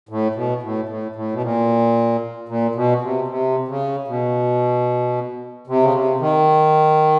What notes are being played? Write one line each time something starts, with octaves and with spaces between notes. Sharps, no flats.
A2
B2
A2
A2
A2
B2
A#2
A#2
B2
C3
C3
C#3
B2
C3
C#3
C3
D#3